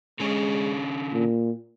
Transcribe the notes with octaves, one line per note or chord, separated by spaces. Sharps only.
D3 G#3 C#4 C#5
A#2